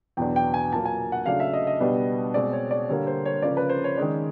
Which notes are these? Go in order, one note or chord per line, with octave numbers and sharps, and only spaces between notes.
E2 B2 F#3 B3 D4 G5
G5
G#5
A#2 F#3 A#3 A5
G#5
F#5
C#3 F#3 A3 D4 F5
E5
D#5
D#5
B2 G3 B3 D4
B2 G#3 C4 D5
C#5
D5
D3 G3 A#3 C#5
C5
C#5
C#3 F3 A#3 C#4 D5
B4
C5
C#5
D#3 G#3 C#4 D5